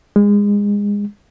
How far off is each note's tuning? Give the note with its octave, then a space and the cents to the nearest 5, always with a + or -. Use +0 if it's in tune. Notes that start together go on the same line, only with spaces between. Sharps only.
G#3 -25